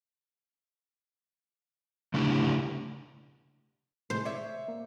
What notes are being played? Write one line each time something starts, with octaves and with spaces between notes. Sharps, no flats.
C#3 A3 D4 E4 G4
A2 C3 G#3 C5
C#5 D5 E5
A#3